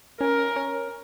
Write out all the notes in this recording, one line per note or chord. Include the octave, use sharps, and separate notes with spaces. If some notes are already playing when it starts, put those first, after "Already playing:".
C#4 A#4
C#4